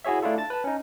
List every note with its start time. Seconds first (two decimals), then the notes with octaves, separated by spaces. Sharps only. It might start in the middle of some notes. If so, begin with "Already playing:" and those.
0.04 E4 F#4 G#4 C#5 E5
0.23 A3 D4 E4 F4 A4
0.38 A5 A6
0.50 B4 A5
0.64 C#4 D#4